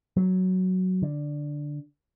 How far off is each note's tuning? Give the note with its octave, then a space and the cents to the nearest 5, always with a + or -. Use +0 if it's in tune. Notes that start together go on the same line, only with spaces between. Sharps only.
F#3 +0
D3 +0